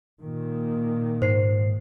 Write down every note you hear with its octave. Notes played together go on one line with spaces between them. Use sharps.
A#2 D#3
G#2 C5 C7